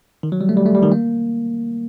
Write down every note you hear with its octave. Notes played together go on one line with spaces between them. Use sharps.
D#3
F#3
G3
A3
G3
A3
G3
D#3
A#3